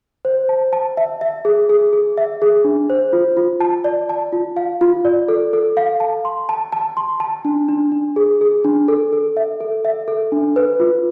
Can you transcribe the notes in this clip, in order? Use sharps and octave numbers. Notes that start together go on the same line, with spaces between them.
C5
A5
A5
E5
E5
G#4
G#4
G#4
E5
G#4
D4
C5
F4
F4
A5
D5
A5
F4
F5
F4
D5
A4
A4
F5
A5
C6
A5
A5
C6
A5
D4
D4
D4
G#4
G#4
D4
A4
A4
E5
A4
E5
A4
D4
B4
F4